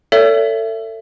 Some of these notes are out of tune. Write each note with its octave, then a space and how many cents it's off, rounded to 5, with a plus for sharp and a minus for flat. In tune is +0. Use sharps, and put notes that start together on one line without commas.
A4 +30 C#5 +45 E5 +20